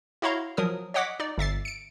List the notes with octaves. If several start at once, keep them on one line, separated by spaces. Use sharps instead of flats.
E4 F#4 C#5 F5 A#5 C6
F3 F#3 A#4 D#6
C#5 D#5 F#5 D6 B6
D#4 D5
G1 E5 A6 C7
C#7 D7